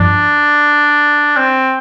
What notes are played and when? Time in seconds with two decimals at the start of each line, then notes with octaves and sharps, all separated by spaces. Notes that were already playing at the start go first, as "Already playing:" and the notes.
Already playing: G2 F3 D4
1.37 C4